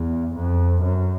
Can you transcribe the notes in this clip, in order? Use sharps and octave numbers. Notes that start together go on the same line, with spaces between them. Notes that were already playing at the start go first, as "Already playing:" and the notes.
Already playing: E2
F2
F#2